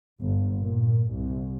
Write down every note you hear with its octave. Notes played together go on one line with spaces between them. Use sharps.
G1
A#2
C2